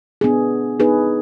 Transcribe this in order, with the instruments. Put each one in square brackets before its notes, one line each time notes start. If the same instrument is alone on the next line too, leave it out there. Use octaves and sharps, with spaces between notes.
[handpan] B3 D4 G#4
B3 D#4 G#4 B4